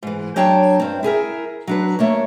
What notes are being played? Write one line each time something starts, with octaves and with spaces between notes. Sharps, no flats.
G#2 E3
F#3 D4 C#5 G5 A5
G2 C4
E4 G#4 A#4 E5
F#3 D4 B4
A3 A#3 C#5